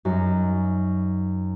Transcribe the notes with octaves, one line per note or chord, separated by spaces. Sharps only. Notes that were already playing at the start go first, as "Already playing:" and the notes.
F#2 D#4 F#4